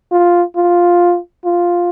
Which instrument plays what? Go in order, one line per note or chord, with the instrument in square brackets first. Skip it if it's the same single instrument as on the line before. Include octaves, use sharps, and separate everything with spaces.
[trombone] F4
F4
F4